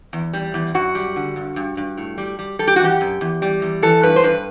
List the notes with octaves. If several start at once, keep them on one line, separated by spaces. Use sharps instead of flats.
E2
G3
E2
F#2 F#4
G3
D3
G2
G2
G2
A2
G3
G3
G3 A4
G4
F#4
E3 G4
F#2
E2
G3
E2
E3 A4
G2 B4
C5
G2 B4